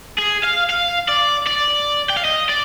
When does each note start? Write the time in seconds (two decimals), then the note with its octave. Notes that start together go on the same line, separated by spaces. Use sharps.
0.19 G#4
0.44 F5
0.70 F5
1.08 D5
1.46 D5
2.10 G5
2.17 F5
2.25 D#5
2.49 D5